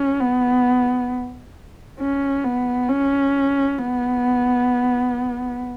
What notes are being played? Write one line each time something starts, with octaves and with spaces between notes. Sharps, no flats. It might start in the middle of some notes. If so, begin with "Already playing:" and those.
Already playing: C#4
B3
C#4
B3
C#4
B3